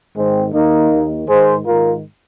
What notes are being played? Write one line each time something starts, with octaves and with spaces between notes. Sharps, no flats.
G#2 D#3 G#3 C4
D#2 D#3 A#3 D#4
D#2 D#3
G#2 D#3 G#4 C5
G#2 D#3 F4 A#4